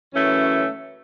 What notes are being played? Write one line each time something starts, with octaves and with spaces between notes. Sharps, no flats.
F#2 E3 A3 C#4